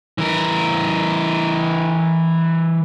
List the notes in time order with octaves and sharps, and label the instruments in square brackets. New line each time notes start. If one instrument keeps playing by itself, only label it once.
[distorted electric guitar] E3 A#4